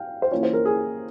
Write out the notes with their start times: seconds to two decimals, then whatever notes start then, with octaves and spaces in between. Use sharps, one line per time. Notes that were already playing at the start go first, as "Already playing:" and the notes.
Already playing: F5 G5
0.22 C5
0.31 E3 A#3 C#4 F4 C#5
0.43 C5
0.53 A#4
0.65 G#4